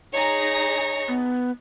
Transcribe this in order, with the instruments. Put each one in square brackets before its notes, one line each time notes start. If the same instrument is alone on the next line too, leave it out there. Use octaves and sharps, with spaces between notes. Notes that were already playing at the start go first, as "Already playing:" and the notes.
[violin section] D#4 G#4 A#6 [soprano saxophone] C#5
[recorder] B3